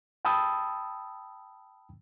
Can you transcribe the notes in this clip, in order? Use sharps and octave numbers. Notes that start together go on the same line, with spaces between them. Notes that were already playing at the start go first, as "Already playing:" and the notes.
G5 A5 B5 D#6 E6